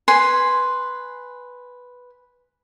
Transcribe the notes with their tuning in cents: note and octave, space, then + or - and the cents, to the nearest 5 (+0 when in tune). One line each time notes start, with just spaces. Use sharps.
B4 +0 G#5 +0 C6 +0